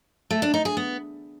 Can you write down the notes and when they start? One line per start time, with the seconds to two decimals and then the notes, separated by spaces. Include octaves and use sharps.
0.31 A3
0.42 D4
0.54 D#4
0.65 G#4
0.77 B3